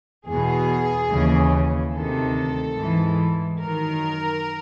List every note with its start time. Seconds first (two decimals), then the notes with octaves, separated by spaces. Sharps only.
0.26 E2 B2 G#4
1.10 D#2 C#3 E3
1.93 D2 C3 D#3 A4
2.76 G#2 E3
3.60 F#2 D#3 A#4